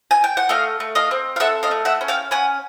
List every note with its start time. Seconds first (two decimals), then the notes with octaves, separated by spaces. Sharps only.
0.11 G#5
0.24 G5
0.37 F#5
0.49 A3 D#5 F5
0.80 A3
0.95 D#5 F5
1.11 C4
1.36 F5
1.40 A4 E5 F#5
1.63 D#5 F5
1.71 A3
1.85 E5 F#5
2.01 C#4
2.08 F5 G5
2.31 C#4 F#5 G#5